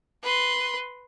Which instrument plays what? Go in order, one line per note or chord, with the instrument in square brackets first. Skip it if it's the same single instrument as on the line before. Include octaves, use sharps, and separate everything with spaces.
[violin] B4 C6